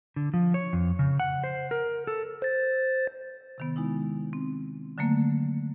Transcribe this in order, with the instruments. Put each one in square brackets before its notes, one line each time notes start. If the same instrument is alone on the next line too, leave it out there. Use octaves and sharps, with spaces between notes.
[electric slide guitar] D3
F3
C#5
F2
C#3
F#5
C5
A#4
A4
[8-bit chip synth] C5 A6
[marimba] C3 D#3 B3
G#3 D#4 E4
C4
D3 F#3 A3 A#3